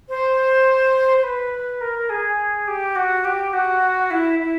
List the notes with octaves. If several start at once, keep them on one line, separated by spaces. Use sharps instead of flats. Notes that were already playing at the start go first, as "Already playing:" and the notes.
C5
C5
B4
A#4
G#4
G4
F#4
G4
F#4
E4
E4